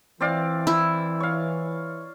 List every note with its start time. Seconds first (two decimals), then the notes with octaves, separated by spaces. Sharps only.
0.21 E3 C4 D5 F5
0.67 E4
1.20 C#5 F5